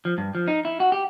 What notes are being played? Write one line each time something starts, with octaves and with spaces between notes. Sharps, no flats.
F3
G2
F3
D#4
E4
F#4
G4